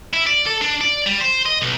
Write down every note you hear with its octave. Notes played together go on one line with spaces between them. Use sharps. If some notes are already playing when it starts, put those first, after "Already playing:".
E4
D5
A4
D4
D5
G3
C5
D#5
B1